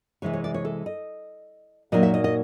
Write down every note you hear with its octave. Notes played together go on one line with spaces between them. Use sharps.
C3 E3 G#3 C#5
C#5
D5
C#5
A4
D#5
A#2 F#3 A#3 D#4 D#5
E5
D#5
D#5